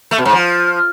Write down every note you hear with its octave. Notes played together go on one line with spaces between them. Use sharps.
A3
B2
G#2
F3